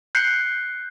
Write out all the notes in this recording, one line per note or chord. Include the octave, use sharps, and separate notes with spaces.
F#6 G6 C7 C#7